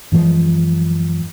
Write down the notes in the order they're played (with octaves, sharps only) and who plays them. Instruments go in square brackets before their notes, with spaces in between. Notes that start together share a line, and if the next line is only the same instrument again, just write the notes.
[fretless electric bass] F#2 E3 F3 G#3